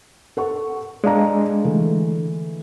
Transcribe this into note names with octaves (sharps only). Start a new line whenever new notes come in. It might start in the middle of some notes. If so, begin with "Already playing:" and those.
A4 F#5 C#6
G#3 D4 D5 F5 A#5
D3 E3 A3